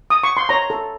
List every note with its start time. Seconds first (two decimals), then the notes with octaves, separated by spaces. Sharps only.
0.10 D#6
0.24 C#6
0.37 C6
0.49 C#5 A#5
0.70 A4